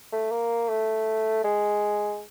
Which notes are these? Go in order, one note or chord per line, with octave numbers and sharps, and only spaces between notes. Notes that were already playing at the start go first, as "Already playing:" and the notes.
A3
A#3
A3
G#3